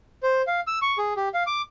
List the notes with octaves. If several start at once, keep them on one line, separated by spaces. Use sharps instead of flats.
C5
F5
E6
C#6
G#4
G4
F5
D6